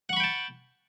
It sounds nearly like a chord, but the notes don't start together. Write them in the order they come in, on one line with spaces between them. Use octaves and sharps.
F#5 C#6 B5 G5 A5